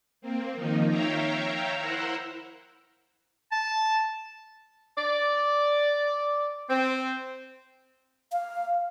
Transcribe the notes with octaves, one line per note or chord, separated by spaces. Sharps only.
A#3 C4
D#3 F3 A#3 D#4
C#5 E5 F5 G5 A#5
E4 A#4 C5 E5 F#5
A5
D5
C4
F5